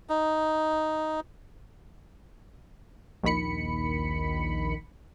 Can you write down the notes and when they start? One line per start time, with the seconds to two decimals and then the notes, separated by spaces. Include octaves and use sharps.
0.09 D#4
3.23 A#1 D#2 D#3 B5 C#7